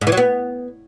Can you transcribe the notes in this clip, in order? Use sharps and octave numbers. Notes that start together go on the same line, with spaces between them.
G#2
E3
F#3
B3